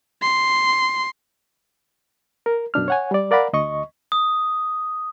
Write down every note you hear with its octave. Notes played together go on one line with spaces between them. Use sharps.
C6
A#4
F#2 B2 D4 F6
C#5 F#5 G#5
G3 D5
A#4 D5 F5 F#5 A#5 B5
D2 D#5 C#6
D#6